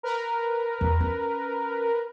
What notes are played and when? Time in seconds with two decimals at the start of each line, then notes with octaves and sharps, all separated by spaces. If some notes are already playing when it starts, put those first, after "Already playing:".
0.03 A#4 B4
0.81 E2
1.01 C#4